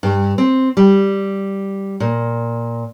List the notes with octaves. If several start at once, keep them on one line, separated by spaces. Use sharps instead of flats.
G2
C4
G3
A#2